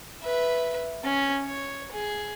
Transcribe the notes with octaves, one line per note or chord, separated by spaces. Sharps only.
B4 E5
C#4
C#5
G#4